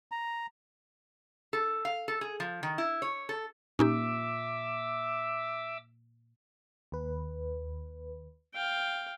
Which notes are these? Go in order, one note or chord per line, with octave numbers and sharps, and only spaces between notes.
A#5
A4
F5
A4
G#4
F3
D#3
E4
C#5
A4
A#2 C#4 D#4 G4 E5 D6 E6
D#2 B4
F5 G5